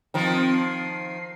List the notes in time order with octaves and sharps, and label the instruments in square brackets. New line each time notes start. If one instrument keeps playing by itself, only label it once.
[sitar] D#3 F3 [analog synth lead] C4
[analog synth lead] C7